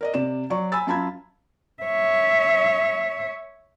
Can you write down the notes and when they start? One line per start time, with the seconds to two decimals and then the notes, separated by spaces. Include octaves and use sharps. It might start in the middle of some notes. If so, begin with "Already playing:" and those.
0.01 A#4 D5 D#5
0.14 C3 D5 E7
0.50 F#3 D5 C#6
0.72 G#5 B5 E6 A6
0.87 F#2 F4 A5 B5 G#6
1.83 C#5 E5